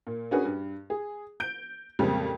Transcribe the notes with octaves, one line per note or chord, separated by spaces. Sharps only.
A#2
C#4 D4 F#4 G#4 A#4 B4
G2
G#4
G6 D7
F2 A#2 C#3 G3 G#3 C4